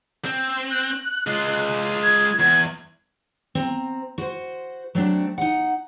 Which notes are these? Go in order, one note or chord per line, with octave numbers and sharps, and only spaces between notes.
C4
F#6
G#3 F4
G#6
E2 G#6
C4 A#5
F#4 C5
F#3 A3 C4 D4
D#4 F#5